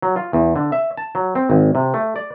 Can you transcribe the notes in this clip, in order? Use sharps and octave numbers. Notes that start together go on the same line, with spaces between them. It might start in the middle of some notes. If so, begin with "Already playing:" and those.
F#3
F4
E2
D3
E5
A5
F#3
C4
G#1
C3
A3
D5